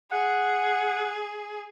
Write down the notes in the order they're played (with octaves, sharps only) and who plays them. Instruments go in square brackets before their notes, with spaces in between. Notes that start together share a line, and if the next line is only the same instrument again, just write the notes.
[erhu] G#4 [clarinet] F#5